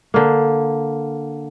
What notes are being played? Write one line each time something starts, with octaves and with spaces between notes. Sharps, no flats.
D3 A#3